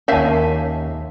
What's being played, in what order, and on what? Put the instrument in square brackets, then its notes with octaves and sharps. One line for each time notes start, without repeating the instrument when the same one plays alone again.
[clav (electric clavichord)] D#2 A#3 [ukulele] C#4 E5 F5 [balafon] A#4 [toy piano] C#5 A5